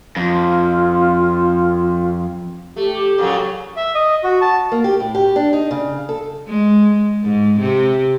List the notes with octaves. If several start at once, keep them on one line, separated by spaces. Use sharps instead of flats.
F2 F4
A3 G4
A#2 C#3 F#3
E5
D#5
F#4
A5
A#3
G4
A2
G4
D4
D#4
C#3
A4
G#3
G#2
C3